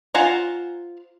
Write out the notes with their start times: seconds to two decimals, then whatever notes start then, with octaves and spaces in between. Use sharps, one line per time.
0.14 F4 C5 F#5 G#5 A#5